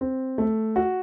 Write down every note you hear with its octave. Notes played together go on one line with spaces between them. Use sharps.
C4
A3
F#4